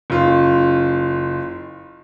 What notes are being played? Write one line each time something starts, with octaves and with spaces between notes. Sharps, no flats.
F#1 F4